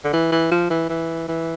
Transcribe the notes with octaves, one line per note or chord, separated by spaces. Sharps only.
D3
E3
E3
F3
E3
E3
E3